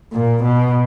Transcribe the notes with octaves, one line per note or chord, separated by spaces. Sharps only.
A#2
B2